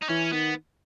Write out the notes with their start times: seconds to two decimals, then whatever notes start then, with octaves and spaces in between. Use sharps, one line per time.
0.02 D#4
0.09 E3 C#4
0.33 D#3 B3